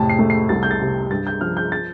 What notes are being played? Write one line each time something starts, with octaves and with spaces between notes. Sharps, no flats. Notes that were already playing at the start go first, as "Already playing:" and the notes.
Already playing: F2 A2 C3 A5
C7
A3
C7
C2 A6
G6
A6
C3
G2 A6
G6
F3 F6
G6
A6